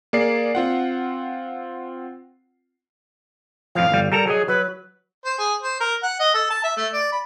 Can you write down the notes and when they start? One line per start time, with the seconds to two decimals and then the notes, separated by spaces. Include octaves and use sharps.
0.13 A#3 G#4 D5 C7
0.55 C4 F4 F#5
3.75 F2 A2 F3 F5
3.92 G1 G3
4.12 G3 A4 A#4 A#5
4.27 F#3 G#4 D#5
4.48 F#3 B4
5.25 C5
5.39 G#4
5.62 C5
5.80 A#4
6.03 F#5
6.20 D#5
6.35 A4
6.50 A5
6.64 E5
6.77 A3
6.93 D5
7.12 B5